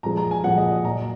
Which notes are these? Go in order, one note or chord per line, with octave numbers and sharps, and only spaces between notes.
A#2 F3 G#3 A#5
A#5
G#5
A#2 F3 G#3 F#5
D#5
D#5
A#2 F#3 A#5